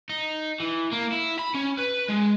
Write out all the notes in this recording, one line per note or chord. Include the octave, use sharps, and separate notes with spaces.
D#4
E3
A#3
E4
B5
C#4
B4
G#3